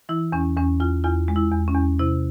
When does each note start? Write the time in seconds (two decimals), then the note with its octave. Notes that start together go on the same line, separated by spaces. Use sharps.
0.09 E3 E4
0.32 E2 C#4
0.56 E2 C#4
0.80 E2 F4
1.04 E2 F4
1.28 G#3
1.36 E4
1.51 E2
1.68 C#4
1.75 E2
1.99 C3 E4